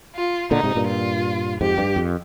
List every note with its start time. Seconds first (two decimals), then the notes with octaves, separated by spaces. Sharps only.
0.15 F4
0.51 A#2 D3 D#4
0.63 G#2 C3
0.75 G2 A#2
0.88 F4
1.60 F2 G#2 G4
1.78 G2
1.96 F2